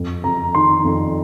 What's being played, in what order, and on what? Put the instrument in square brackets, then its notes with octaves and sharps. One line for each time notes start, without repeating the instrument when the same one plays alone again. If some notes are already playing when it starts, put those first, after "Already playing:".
Already playing: [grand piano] F2
F2 A#5
D#3 C6
F2